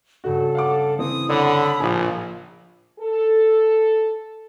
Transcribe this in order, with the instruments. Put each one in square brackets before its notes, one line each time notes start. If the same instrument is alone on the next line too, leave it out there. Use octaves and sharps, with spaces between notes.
[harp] G2 C#3 E7 [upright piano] F#4 [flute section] A4
[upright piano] F5 F#5 D6
[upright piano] E3 C4 [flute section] D#6
[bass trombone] D3 [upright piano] C#5 F#5 [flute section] B5 D#6 E6 [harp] F#6 D#7
[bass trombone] A#1 [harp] A2 D#4 [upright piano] F3 G#5
[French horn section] A4